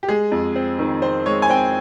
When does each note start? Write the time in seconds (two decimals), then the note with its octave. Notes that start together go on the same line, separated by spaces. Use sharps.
0.03 G4
0.09 G#3 G#4
0.31 F2
0.56 C4
0.79 D#3
1.02 C4 C5
1.26 G#3 C#5
1.42 G#5
1.49 C4 G5